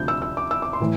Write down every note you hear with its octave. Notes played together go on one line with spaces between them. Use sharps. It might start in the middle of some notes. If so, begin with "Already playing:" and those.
Already playing: D2 C3 F3 G6
E6
E6
D6
E6
D6
C6
A2 E3